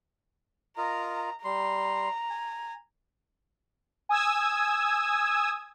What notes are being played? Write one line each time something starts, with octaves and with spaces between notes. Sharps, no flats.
F4 A#4 D#5 A#5
G3 A#5 C6
G#5
G#5 D#6 E6 G#6